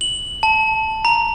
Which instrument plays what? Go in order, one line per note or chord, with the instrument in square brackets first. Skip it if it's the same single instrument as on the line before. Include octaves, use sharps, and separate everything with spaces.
[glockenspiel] F#7
A5
A#5